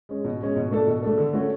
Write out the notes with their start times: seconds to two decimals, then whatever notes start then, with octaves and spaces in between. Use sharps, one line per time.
0.09 G#3 C#4
0.24 B2
0.41 G#3 C#4
0.56 B2
0.71 A3 D4 A4
0.87 B2
1.02 A3 D4 A4
1.18 D3
1.33 A3 C#4 F#4